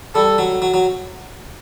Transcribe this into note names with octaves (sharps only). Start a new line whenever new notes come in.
G3 A4
F#3
F#3
F#3